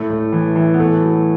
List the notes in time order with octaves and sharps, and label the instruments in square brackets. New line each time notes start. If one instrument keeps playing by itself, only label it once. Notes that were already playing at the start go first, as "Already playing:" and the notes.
Already playing: [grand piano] A2 A3
A2
E3
E3
B3
A2 A3
F#3